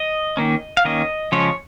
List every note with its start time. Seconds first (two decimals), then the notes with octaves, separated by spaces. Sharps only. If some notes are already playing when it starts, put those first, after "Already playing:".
Already playing: D#5
0.37 D#3 A#3 C#4
0.77 F5
0.85 D#3 A#3 C#4 D#5
1.32 C#3 F3 G#3 C#4 C#5